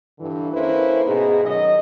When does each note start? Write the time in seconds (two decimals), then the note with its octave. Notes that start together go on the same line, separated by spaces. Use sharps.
0.19 G2 D3 E3
0.53 A#3 C#4 E4 A4 B4 C5
1.06 G#2 B2 D#4 G#4
1.44 D#3 F#3 C#4 D#5